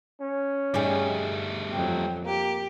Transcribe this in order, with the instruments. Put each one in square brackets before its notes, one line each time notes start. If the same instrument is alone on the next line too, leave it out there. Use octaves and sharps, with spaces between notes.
[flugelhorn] C#4
[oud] G2 D#4 G#4 [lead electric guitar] G3 A3
[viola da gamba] F2 F#3 [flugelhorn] G5
[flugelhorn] A#3 [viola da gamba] G4